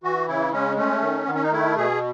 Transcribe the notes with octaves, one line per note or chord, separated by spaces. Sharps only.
E3 F#4
C#3 E4
G#3 C#4
A3 C#4
D#3
D#3 B3
C#4
D#4
A3 E4
B2 G#4